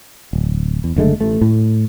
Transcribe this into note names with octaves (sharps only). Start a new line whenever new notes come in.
D1
E2
F#1 D3 G#3 A3
A1 A3
A2